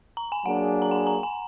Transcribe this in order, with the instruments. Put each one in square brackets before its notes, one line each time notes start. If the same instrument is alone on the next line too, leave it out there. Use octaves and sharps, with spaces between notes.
[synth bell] A#5
G#5
[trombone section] F#3 A#3 D4 G#4 [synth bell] F#5
[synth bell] A#5
G#5
A#5
G#5